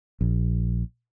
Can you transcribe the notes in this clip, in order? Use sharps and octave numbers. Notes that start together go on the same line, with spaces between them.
A#1